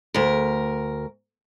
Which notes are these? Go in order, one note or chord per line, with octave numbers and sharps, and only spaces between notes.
D2 A#4